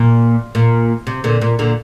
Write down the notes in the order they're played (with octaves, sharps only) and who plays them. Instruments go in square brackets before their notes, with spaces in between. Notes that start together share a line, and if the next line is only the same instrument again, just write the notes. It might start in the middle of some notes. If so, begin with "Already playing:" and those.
Already playing: [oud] A#2
A#2
C3
A#2 D3
A#2
A#2 D3